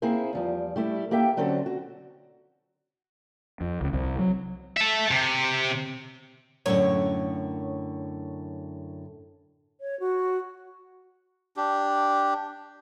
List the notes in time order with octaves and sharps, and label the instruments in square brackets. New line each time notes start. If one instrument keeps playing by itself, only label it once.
[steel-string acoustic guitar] A#3 C4 E4 G#4 C5
E2 F3 G3
G3 A3 E4
A#3 G4 A4 E5 G5
D3 F#3 C4 C#4 A4
F#4
[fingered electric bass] F2
C#2
C2
F#3
[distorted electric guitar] E5 A5
C3
[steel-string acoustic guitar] F#2 A2 D3 [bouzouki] C#5
[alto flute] C#5
F#4
[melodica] D4 G4